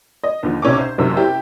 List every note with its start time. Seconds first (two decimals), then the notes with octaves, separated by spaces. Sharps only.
0.24 D#5
0.43 D#2 D3 F3
0.62 B1 C3 C#4 C#6 D6
0.79 C5
0.98 F#1 F#2 C3 D#3
1.17 E4 G4